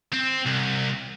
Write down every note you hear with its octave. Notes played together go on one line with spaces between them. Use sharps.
C4
C2